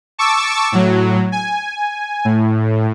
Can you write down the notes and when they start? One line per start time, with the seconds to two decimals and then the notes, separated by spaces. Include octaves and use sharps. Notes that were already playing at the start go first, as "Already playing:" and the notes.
0.18 A5 C#6 D6 E6
0.72 A2 F#3
1.32 G#5
2.25 A2